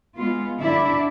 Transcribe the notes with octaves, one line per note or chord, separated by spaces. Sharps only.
G#3 B3 F4
G2 D3 D4 E4 D5 E5